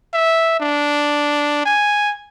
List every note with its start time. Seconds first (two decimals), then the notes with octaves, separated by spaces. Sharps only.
0.14 E5
0.60 D4
1.66 G#5